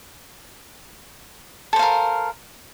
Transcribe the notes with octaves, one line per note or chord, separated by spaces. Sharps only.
A4 A#4 C5 F5